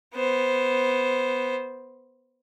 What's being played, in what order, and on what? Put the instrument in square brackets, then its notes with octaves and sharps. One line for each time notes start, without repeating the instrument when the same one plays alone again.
[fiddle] B3 C5